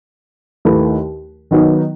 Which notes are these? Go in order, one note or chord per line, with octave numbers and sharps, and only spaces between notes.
D#2 D#3 A3 E4 B4
D#3 F#3 B3 D#4